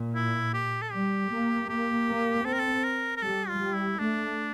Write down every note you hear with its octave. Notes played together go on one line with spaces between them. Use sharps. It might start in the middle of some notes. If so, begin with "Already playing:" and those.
Already playing: A#2
E4
G4
A4
G3 G4
A#3
A#3 G4
A#3
C4 A4
A#4
A4
A#4
A#4
G3 A4
F4
G3
E4
A3 D4